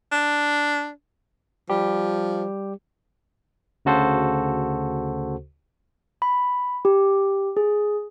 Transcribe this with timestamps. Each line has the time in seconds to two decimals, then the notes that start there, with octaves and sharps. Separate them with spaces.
0.12 D4
1.70 F3 G3 G4
3.85 D2 C#3 F#4 A4 C5
6.22 B5
6.85 G4
7.57 G#4